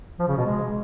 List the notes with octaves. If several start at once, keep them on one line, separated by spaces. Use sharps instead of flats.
F3
C#3
B2
G#3